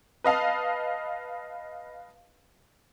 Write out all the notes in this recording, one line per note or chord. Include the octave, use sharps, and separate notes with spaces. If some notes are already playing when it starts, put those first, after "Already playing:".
B4 D#5 F5 A5